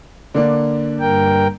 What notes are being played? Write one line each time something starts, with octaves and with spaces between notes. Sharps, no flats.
D3 A#3 D4
G2 A#4 G5